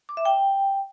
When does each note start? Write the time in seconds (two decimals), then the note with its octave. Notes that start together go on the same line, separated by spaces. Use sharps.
0.09 D6
0.17 E5
0.25 G5